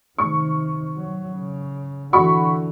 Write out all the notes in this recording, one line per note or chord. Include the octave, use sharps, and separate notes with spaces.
C3 D#3 C#6
F#3
C#3
D3 E3 F#4 B5 C#6